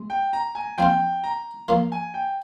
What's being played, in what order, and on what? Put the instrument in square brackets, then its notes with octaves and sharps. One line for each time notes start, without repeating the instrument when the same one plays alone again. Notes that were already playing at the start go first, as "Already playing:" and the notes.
Already playing: [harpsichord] G#3
[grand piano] G5
A#5
G#5
[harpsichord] F3 C4 F4 [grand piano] G5
[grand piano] A#5
[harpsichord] F3 A#3 F4
[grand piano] G#5
G5